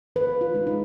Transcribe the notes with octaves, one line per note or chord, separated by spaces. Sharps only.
D#3 B4
F4
G#3 D#4
D#4